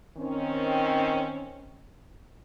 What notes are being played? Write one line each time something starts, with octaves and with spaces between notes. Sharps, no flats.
D#3 C4 C#4